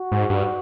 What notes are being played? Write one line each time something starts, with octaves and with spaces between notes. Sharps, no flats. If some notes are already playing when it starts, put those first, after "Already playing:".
Already playing: F#4
G#2
G2